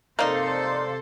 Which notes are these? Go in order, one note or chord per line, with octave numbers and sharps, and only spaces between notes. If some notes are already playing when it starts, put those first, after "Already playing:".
C3 A#3 D#4 A4 C5 D5 F5 C6